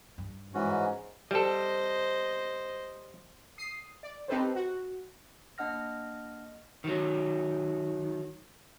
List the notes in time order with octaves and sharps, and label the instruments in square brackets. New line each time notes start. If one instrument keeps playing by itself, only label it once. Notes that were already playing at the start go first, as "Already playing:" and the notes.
[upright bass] G2
[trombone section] G#2 [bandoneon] E3 C#4 F#4
[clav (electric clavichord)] G3 A4 [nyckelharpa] C5 D#5
[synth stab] D#6 C7
D5
C4 D#4 G4 A4 B4 C5
F#4
[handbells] A#3 D4 D#5 F#5 F6 A#6
[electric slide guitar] D#3 F#3